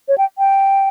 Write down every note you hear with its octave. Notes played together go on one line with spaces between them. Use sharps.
C#5
G5
G5